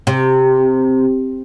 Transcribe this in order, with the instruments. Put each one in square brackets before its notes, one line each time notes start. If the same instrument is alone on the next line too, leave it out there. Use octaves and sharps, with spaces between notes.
[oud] C3